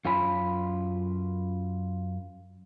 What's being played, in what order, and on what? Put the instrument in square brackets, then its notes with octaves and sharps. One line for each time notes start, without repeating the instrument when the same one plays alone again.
[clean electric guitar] F#2 F4 C#5 G#5 B5